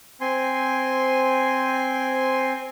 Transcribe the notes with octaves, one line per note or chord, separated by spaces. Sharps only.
C4 G#5 C6